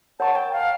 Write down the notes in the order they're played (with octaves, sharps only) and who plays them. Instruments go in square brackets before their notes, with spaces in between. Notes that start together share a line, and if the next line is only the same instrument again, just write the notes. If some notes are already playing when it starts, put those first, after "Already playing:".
[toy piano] A#4 C#5 F#5 A#5 C#6 [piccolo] A5
[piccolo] G5
F5